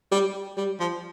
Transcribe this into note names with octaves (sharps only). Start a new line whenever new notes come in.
G3
G3
F3